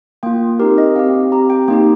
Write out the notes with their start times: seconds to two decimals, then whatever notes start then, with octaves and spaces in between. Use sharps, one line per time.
0.23 A#3 F4 G5
0.59 C4 D#4 G4 A#4
0.78 D#5
0.96 C4 G4 F5
1.32 C4 G4 A#5
1.50 G5
1.68 A#3 D#4 G4 G5